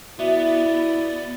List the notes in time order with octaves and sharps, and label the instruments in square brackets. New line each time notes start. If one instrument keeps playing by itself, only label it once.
[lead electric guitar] B3 [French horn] E4 [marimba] F#4 E5 [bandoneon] D5